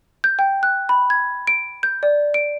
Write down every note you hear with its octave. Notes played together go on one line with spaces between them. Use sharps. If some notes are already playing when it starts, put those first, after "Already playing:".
G6
G5
F#6
B5
G#6
D7
G6
D5
D7